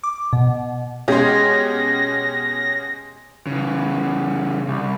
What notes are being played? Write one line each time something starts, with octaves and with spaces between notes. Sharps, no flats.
D6
B2
B2 G#3 C#4 G4 C6 A#6
C#3 E3
C2